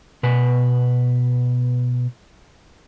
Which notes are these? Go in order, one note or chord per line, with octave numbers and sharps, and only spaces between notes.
B2 B4 G#5